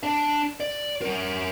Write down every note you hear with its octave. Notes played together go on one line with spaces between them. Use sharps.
D4 A5
D5
C#4 A#4